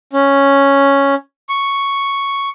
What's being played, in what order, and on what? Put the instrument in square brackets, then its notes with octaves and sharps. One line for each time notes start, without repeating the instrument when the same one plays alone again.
[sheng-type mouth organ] C#4
C#6